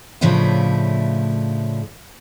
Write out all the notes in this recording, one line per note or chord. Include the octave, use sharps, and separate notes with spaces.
A2 C#3 F3 A3 D4 E4